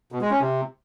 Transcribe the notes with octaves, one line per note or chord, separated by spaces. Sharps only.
B2
G#3
C#4
C3